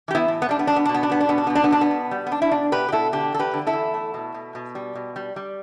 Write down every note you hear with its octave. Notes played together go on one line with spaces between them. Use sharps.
E3 G4
B3 E4
A2
B3
G3 D4
B3
B2 D4
B3
B2 D4
B3
D4
G3 B3
D4
B2 B3
D4
B2 B3
D4
B3
B2 D4
B3
B2
G3
B3
G3 D4
E4
B2 D4
B2 G4 B4
G4
B2 E4 A4
D3 D4 G4
E2 A4
G4 B4
D3
E4 A4
E2
A3
B2
B2
B2
G3
B2
G3
G3